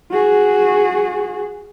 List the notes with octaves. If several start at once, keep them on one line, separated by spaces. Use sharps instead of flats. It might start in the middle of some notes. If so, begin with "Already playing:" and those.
F#4 G#4